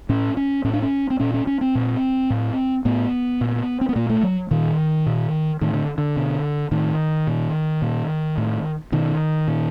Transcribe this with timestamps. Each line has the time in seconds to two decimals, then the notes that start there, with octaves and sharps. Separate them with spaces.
0.09 A2 C#4
0.37 C#4
0.65 A2 C#4
0.73 D4
0.82 C#4
1.10 C4
1.20 A#2 C#4
1.34 C#4
1.47 C#4
1.61 C4
1.75 A#2
2.30 A2
2.85 A2 B3
3.41 A#2
3.81 C4
3.89 B3
3.96 A#2 A#3
4.10 A3
4.23 F#3
4.51 A#2 D#3
5.06 A#2
5.61 A2 D#3
5.74 D3
5.98 D3
6.16 B2
6.71 A2 D#3
7.27 A#2
7.82 A#2
8.38 A2
8.92 B2 D#3
9.48 A#2